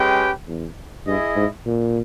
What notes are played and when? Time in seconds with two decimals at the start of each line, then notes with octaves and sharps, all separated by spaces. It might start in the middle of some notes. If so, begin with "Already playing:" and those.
Already playing: G#3 C#4 G4 B4 G5
0.48 E2
1.07 G2 E4 G#4 D#5
1.36 G#2
1.66 A#2